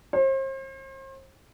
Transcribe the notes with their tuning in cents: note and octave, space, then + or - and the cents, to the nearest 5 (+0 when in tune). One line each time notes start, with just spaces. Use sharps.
C5 +40